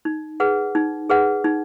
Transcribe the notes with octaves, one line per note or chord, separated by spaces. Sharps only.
D#4
G#4 B4 F#5
D#4
G#4 B4 F#5
D#4